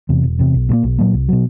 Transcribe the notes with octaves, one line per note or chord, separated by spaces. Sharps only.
E2 C3
E1
E2 C3
B1
A#2 F#3 A#3
B1
A#2 F#3 A#3
C2
B2 F#3